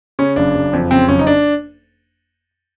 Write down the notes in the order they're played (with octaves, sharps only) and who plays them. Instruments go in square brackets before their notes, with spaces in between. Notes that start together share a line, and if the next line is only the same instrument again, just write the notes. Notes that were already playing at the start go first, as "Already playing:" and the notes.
[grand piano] C#3 C#4
F#1 D4
F#1
F2
C#3 C4
F#1 C#4
D#4
D4